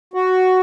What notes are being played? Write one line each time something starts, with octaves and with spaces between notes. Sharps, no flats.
F#4